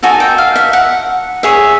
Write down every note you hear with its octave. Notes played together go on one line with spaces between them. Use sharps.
D#4 F#4 A4 G#5
G5
F5
E5
F#5
G#4 C#5 E5